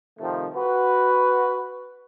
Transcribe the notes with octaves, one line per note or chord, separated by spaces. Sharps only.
C3 D#3 F3 A3
F#4 B4